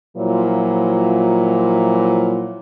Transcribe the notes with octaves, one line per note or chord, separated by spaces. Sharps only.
A#2 F3 F#3 E4 F4